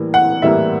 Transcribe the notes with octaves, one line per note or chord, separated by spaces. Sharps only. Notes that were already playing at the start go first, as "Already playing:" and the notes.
Already playing: A2 E3 G3 A#3
F#5
A2 E3 G3 A#3 E5